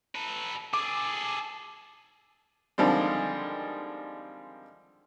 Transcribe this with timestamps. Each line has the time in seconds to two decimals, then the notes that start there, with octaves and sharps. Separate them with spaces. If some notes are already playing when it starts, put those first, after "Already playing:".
0.15 A4 B4
0.74 G#4 A4 D6
2.78 D3 D#3 F3 G3 G#3 C4